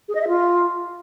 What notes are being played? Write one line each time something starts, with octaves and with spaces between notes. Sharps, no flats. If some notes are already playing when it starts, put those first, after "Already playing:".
G#4
D#5
E5
F4